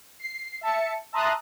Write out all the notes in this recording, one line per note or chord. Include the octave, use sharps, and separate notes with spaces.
C7
E5 A5 C#7
E5 A5 A#5 C6 D#6 F#6